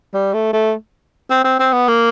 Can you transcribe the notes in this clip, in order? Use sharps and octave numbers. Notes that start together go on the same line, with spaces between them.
G3
A3
A3
C4
C4
C4
B3
A#3